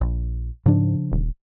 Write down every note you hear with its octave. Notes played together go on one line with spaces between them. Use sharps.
A#1
G#2 C#3 F3 D4
D#1